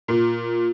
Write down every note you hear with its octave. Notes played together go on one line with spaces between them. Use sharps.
A#2